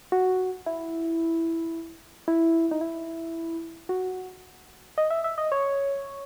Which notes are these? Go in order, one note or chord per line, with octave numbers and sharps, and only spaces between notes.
F#4
E4
E4
D#4
E4
F#4
D#5
E5
E5
D#5
C#5